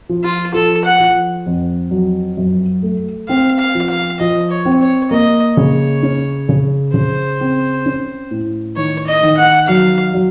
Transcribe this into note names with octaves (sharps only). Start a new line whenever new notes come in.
F3
F4
F3 A4
F#5
F3
F2
F#3
F#2
A3
C4 F5
F5
F3
F5
F3 D#5
C#5
C4
C#5
A#3 D#5
C#3 C#5
C#4
C#3
C#3 C5
C4
C#4
A2
D#3 C#5
D#5
D#3
F#5
F#3 F5
F#3